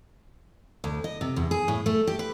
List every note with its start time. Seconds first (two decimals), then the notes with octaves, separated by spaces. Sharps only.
0.84 D2
1.04 D#5
1.21 C3
1.36 E2
1.51 G#4
1.68 A2
1.86 A3
2.07 G4
2.19 B4